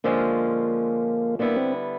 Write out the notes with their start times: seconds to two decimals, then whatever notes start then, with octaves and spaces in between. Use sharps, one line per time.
0.04 D3 F3 G#3 A#3 C#4 F4
1.39 D3 G3 A#3 B3 E4
1.56 C4